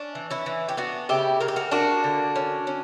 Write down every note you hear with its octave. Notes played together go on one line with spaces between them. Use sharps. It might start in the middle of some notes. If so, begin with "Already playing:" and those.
Already playing: C#4 D4
E3
C#4 E4
E3
G4
B3 D4 F#4
C#3 E4 G4
C#3 A#4
G4
F#4 A#4
A#3 D4 F#4
D3
C#4
C#4